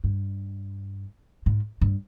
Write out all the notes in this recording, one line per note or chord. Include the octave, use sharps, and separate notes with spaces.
G2
G#2
G2